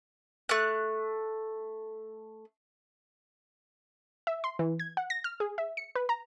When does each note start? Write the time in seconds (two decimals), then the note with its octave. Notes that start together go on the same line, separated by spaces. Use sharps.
0.49 A3 F#6
4.27 E5
4.44 C6
4.59 E3
4.80 G#6
4.97 F#5
5.10 A#6
5.24 F6
5.40 G#4
5.58 E5
5.77 C#7
5.95 B4
6.09 A#5